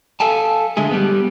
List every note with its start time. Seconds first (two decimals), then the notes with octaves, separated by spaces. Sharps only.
0.20 A4 F5 G#5 A5
0.77 D3 G#3 A3 G#4
0.91 G3 B3